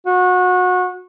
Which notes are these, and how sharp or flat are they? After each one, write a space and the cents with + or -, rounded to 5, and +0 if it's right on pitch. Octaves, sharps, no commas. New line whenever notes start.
F#4 -25